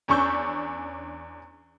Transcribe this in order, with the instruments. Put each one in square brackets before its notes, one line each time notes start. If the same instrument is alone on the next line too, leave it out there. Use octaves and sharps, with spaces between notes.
[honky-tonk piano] E2 C#4 D4 C#6 E6 G6